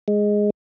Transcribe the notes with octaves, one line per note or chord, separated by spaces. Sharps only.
G#3